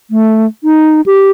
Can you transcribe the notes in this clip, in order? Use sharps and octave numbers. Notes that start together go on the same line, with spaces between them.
A3
D#4
G4